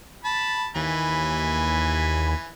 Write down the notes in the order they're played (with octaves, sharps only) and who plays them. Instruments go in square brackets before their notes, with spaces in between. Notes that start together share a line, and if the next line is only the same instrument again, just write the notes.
[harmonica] A5 B5
[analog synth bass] D#2 [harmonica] E3 G#5 B5